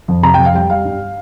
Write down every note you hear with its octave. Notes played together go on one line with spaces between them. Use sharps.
F2
C3 A#5
F2 G5
F5
G3 G5
G3 F5
G2